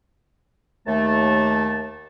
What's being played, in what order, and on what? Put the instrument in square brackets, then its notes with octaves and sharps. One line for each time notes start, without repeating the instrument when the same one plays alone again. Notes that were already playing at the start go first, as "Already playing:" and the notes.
[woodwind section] D#2 A3 A5